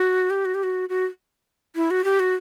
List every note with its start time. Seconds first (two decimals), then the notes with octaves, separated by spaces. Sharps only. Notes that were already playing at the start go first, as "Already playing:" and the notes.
Already playing: F#4
0.30 G4
0.45 F#4
0.55 G4
0.63 F#4
0.89 F#4
1.76 E4
1.91 F#4
2.04 G4
2.20 F#4